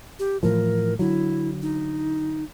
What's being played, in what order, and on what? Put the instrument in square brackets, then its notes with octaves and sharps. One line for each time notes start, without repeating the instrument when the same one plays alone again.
[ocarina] G4
[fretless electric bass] A2 E3 F3 [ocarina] A#4
[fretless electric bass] D3 F#3 [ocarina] E4
[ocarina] D#4